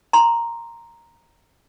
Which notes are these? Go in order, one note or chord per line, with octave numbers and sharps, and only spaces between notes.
A#5 C6